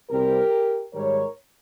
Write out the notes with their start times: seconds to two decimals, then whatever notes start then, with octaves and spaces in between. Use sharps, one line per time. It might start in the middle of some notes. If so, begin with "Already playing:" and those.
0.10 C2 C3 G3 C4 G4 A#4
0.94 G#2 D#3 G3 A#4 C#5